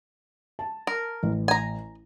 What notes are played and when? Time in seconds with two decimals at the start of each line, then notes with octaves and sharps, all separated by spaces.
0.59 A5
0.87 A#4
1.23 A1
1.48 G#5 A#5